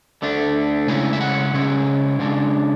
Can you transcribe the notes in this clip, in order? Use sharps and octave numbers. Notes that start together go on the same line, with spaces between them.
D2 D3 A3 D4
C#3 G#3 C#4 E4 G#5
E5
F#5
C#3 G#3 C#4 E4
C#3 G#3 D4